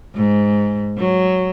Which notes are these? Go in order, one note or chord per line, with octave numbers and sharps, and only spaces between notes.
G#2
F#3